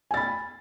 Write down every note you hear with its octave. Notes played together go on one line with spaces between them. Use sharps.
G#5 B5 A6